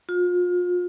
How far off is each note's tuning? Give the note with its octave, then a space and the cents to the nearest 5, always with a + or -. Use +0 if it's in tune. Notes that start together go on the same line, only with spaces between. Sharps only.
F4 +35